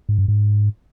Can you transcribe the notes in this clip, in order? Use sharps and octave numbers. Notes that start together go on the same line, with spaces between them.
G#2
G2
G#2